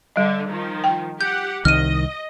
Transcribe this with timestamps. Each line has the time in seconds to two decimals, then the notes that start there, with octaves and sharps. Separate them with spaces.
0.16 D3 G3 D#5
0.49 D#3 F3
0.84 G5
1.21 G4 F#5 G6
1.65 C2 D#3 D#5 F6 D#7